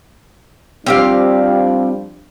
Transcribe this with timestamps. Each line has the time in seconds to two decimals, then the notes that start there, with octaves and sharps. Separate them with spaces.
0.87 F3 G3 C4 D4 G4 F5